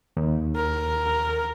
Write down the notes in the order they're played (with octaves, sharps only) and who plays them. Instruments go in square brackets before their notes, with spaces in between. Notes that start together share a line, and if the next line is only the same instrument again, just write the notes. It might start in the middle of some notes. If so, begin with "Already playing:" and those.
[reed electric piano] D#2
[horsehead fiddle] A#4